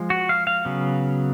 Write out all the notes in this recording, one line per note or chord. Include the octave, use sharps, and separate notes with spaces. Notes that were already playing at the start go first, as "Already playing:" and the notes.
Already playing: F3 G#3
F#4
F5
F5
C#3 F#3 B3